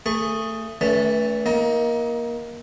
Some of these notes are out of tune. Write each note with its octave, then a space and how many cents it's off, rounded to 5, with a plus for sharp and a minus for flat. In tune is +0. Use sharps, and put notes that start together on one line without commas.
A3 +25 G#4 +0 C#6 -10
E3 -30 A3 +0 C#4 +40
A#3 +20 D#4 +35